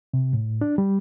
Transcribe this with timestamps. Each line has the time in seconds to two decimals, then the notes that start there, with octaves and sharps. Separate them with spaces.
0.14 C3
0.33 A2
0.61 D4
0.78 G3